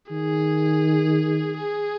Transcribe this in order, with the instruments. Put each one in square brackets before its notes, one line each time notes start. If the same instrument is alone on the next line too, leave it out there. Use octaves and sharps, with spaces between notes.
[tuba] D#3 [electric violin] G#4
[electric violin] G#4